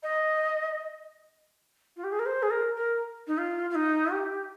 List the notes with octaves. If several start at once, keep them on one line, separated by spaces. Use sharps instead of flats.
D#5
F4
G4
G#4
A#4
C5
G#4
A#4
A#4
D#4
F4
F4
D#4
G4